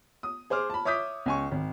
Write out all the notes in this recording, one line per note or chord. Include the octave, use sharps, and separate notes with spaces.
D#6
G#4 C5 D6 F6
A5 B5
C#5 E5 D6 D#6 G6 B6
C#2 G#5 C#6
G#1